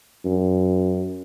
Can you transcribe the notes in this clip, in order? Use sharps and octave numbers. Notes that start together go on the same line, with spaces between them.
F#2